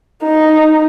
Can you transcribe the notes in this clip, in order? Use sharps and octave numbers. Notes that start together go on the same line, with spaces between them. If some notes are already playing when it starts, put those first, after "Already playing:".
D#4